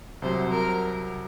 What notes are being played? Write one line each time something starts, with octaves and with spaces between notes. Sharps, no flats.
C2 C3 F#3 C5
A#4